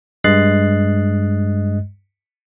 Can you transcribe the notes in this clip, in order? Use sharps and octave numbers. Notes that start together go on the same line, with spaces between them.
G2 G#3 D#5 F#6 A6 C7